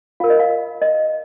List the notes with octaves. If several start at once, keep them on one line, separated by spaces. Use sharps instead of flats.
F4 A#4 F5
D#5
F5
D#5